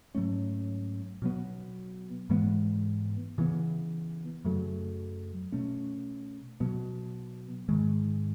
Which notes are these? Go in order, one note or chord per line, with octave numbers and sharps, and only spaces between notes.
G#2 F#3 A3 C#4
B2 F#3 B3
G#2 E3 G#3 B3
C#3 E3 B3
F#2 C#3 F#3 A3
B2 A3 C#4
B2 F#3 B3
G#2 D#3 G#3